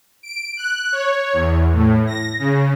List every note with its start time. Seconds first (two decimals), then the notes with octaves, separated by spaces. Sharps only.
0.23 D7
0.57 F#6
0.92 C#5
1.33 E2
1.73 A2
2.07 A#6
2.39 C#3